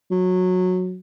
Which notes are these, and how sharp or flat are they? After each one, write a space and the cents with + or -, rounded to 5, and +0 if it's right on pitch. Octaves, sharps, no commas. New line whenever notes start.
F#3 -15